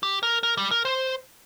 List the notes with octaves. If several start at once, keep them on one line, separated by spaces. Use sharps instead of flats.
G4
A#4
A#4
G3
A#4
C5